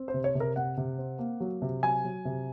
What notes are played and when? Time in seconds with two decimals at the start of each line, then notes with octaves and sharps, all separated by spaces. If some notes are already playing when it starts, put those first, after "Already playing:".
Already playing: C4
0.08 C5
0.14 C3
0.24 C#5
0.35 C3
0.40 A#4
0.56 C3 F#5
0.77 C3
0.98 C4
1.19 A#3
1.40 F#3
1.62 C3
1.83 F#3 G#5
2.04 F#3
2.25 C3